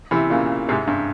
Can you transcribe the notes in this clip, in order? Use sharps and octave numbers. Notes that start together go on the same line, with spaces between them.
C3 E3
A#2 C#3
G#2 C3
G2